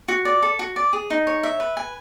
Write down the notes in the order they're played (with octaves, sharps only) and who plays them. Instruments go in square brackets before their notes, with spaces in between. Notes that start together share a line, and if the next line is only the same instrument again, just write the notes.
[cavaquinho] F#4
D5
A4
F#4
D5
G#4
D#4
C#5
E5
B4
G#5